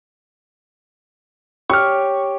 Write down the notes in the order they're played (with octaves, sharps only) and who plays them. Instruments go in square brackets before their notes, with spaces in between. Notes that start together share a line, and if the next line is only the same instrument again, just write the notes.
[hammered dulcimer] G4 C#5 [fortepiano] C#6 F6